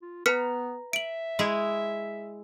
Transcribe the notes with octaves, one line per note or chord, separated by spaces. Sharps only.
F4
B3 B4 A#5 F6 B6 C#7
E5 D7 F#7
G#3 E4 G#4